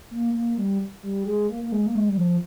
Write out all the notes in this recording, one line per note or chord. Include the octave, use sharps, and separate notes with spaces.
A#3
A#3
G3
G3
G#3
A#3
A#3
G#3
A#3
G#3
G3
F3